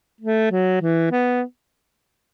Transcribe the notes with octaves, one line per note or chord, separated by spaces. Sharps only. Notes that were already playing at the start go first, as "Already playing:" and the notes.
A3
F#3
E3
B3